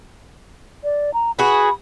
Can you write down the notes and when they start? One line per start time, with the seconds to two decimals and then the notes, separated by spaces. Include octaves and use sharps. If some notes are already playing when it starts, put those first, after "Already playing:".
0.84 D5
1.14 A#5
1.39 F#4 G#4 B4 B5